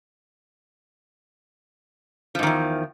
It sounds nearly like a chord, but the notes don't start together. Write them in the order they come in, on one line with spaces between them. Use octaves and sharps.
F3 G#2 D#3 E2